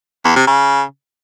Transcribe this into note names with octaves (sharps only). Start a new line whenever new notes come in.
E2
C3
C#3